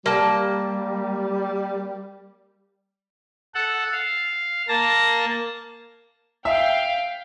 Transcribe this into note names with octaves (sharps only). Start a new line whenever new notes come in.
G3 A#3 A5
A4 F#5
F5
A#3 A5 A#6
E5 F5 G5